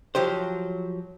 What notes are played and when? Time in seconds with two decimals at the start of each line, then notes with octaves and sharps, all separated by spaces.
0.15 F3 F#3 G4 C5